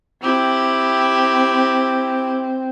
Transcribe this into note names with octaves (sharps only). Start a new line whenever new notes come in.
C4 E4 G4